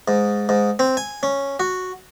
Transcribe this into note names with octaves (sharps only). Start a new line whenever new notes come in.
G#2
G#2
C4
G#5
C#4
F#4